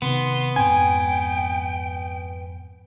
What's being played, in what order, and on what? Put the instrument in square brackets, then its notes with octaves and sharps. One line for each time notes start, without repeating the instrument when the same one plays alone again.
[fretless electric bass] C3 D#3 [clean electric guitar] B3 [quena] C6
[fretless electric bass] F2 G#2 C4 [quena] G5 [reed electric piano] G#5